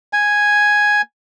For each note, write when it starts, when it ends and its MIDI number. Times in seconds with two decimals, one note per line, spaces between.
0.13 1.02 80